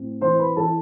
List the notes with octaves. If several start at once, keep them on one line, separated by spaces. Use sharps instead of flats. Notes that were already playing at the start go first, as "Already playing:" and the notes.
Already playing: A2 C4
E3 C5 C6
B4 B5
E3 A4 A5